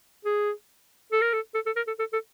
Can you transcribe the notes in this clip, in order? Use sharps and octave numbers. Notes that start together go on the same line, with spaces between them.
G#4
A4
A#4
A4
A4
A4
A#4
A4
A4
A4